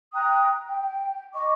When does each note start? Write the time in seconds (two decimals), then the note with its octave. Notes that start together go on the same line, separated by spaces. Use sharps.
0.13 G5 A#5 D#6 F#6
0.68 G5
1.33 D#5 C#6 D6